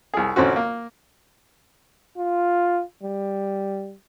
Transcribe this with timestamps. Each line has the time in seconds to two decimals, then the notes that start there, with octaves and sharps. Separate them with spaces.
0.14 C2 G#4
0.36 A1 D3 C4 C#4 F#4
0.56 A#3
2.17 F4
3.03 G3